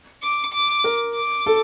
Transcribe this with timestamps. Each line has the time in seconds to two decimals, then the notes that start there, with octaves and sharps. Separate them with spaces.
0.23 D6
0.53 D6
0.84 A#4
1.15 D6
1.46 A4